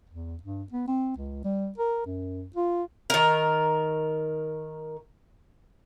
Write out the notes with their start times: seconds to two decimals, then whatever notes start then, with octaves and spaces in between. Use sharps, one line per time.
0.10 E2
0.43 G2
0.73 B3
0.88 C4
1.16 C#2
1.44 G3
1.78 A#4
2.06 F#2
2.56 F4
3.10 D#3 A#4